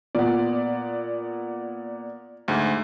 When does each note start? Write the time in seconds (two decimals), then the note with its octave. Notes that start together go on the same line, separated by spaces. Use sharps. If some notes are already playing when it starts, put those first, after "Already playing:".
0.15 A#2 B3 D5
2.48 D2 G#2